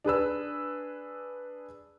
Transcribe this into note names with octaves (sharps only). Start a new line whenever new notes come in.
D4 G#4 B4 E6